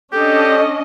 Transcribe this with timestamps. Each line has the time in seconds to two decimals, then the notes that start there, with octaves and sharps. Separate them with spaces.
0.13 C#4 D4 G4 A4 D#5